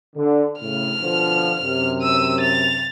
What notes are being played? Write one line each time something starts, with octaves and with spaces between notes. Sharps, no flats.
D3
A2 C#3 F6
B2 D3 F3
F#2 C3
E6 D#7
A6 F7